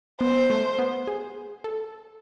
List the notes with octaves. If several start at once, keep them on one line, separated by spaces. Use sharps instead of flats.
B3 C5
A3
B3
G#4
A4